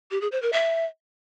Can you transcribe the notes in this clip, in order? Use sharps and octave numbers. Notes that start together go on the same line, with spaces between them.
G4
G#4
C5
A#4
E5